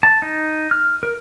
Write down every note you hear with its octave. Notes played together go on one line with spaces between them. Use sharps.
A5
D#4
F6
A#4